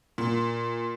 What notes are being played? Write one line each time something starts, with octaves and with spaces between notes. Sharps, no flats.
A#2